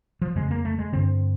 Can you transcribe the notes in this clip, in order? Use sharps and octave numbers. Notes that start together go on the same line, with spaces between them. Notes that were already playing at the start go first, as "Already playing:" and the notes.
F3
F2 C#3 G#3
A#3
A3
G#3
G2 D3 C4